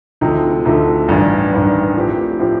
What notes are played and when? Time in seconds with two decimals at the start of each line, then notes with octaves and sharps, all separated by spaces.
0.21 D2 C3 F3 A3 D#4
0.65 D2 C3 F3 A3 D#4
1.08 A1 G2 D#3
1.52 A1 G2 D#3
1.95 A2 F3 C4 G4
2.39 A2 F3 C4 G4